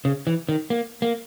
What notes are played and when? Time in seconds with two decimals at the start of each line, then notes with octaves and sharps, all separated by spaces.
0.05 C#3
0.27 E3
0.49 D#3
0.70 A#3
1.02 A#3